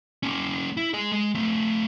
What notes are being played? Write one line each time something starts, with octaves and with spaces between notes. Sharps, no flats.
A#3 C#4
E4
G#4 D#5
G#3
A3 C4